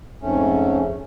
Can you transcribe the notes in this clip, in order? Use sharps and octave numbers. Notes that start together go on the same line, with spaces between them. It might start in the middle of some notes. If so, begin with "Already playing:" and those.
F2 G#2 A3 C#4